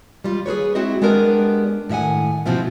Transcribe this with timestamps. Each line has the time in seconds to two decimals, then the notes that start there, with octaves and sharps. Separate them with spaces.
0.24 G3 G#3 F4
0.46 G#4 A4 B4 C#5
0.75 G#3 C4 E4 F#4 D#5
1.02 G#3 B3 D4 G4 A#4 D5
1.89 A2 D#3 E5 F#5 G#5
2.46 G#2 B2 F3 C4 E4 F4